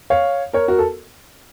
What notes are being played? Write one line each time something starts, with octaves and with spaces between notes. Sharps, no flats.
C#5 F5
A#4 C#5
F#4 A#4
A4